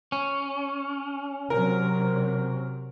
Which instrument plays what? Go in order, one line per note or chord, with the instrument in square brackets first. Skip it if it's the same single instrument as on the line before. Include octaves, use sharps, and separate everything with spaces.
[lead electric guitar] C#4
[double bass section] C3 F#3 [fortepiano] A#4